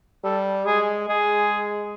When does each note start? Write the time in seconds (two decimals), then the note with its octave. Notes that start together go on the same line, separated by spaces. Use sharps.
0.24 G3 A4
0.66 G#3 G#4
1.09 G#3 G#4